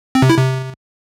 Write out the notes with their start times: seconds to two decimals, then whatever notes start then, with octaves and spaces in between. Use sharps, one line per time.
0.15 C4
0.22 C3
0.30 E4
0.37 C3